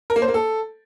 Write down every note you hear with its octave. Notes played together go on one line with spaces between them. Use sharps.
A#4
A#3
C5
A#3
A4